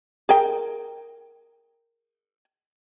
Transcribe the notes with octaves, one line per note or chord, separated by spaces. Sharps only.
G#4 A#4 G5